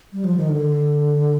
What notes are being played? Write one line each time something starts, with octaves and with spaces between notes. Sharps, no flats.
G3
F3
D#3
D3